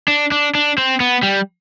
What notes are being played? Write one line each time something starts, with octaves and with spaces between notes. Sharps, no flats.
D4
D4
D4
C4
B3
G3